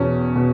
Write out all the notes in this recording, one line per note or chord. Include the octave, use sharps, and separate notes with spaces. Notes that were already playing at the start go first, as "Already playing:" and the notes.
Already playing: E2 B2 C#4
B2